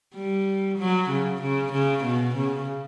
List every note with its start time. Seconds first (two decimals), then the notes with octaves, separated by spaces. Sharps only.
0.15 G3
0.78 F#3
1.10 C#3
1.42 C#3
1.72 C#3
2.04 B2
2.35 C#3